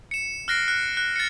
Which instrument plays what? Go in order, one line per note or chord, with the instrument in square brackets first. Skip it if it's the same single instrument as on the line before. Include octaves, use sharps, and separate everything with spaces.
[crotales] C#7 E7
F6 F#6 A#6 C7 D7
F#6
F#6
A6 C#7